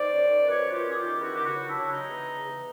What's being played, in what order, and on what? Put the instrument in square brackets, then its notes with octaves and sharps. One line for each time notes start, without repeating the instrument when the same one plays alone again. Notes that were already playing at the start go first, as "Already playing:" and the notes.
Already playing: [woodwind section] D#3 C5 D5
C#4
D#3
F#2 B4 C#5
D#3 F4 G4
C#4 G#4
F4 G4
D#3
E2 E4 F#4
C#3 G4
E4 F#4
F#3
D4 E4
F#3
C#3 D#4
E2
C#3
E2